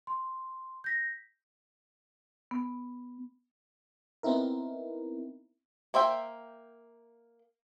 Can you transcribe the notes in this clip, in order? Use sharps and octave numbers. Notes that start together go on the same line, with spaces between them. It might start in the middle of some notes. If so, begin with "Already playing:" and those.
C6
G6 A#6 B6
B3
B3 C4 D#4 E4 A#4
A#3 C5 E5 G5